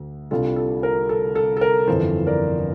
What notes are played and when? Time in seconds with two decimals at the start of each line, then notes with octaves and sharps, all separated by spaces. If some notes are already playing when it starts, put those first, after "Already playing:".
Already playing: D2
0.31 C2 C3 G3 D4 F4 A4
0.56 A4
0.83 A#4
1.09 A4
1.35 A4
1.57 A4
1.61 A#4
1.87 G1 F2 E3 A4 C5
2.27 A#4 D5